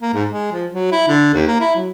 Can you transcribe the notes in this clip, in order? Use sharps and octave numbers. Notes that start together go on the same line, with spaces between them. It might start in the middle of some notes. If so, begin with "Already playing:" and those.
A#3
G#2
G#3
F3
F#3
E4
D3
D#2
A#3
E4
F#3